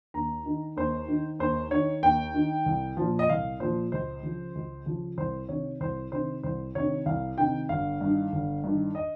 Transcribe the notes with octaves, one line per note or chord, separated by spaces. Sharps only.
D#2 A#5
D#3
D#2 C5
D#3
D#2 C5
D#3 C#5
D#2 G5
D#3
C2
A#2 F3
D#5
C2 F5
A#2 F3 C5
C#2 C5
C#3 F3
C#2
C#3 F3
C2 C5
C3 D#3 C#5
C2 C5
C3 D#3 C5
C2 C5
C3 D#3 C#5
C2 F5
C3 D#3 G5
G1 F5
G2 D#3
G1
G2 D#3
D#5